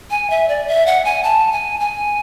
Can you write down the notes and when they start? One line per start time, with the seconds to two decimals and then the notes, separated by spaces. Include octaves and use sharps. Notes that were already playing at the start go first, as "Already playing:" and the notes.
0.11 G#5
0.30 E5
0.48 D5
0.68 E5
0.86 F#5
1.05 G#5
1.23 A5
1.52 G#5
1.80 G#5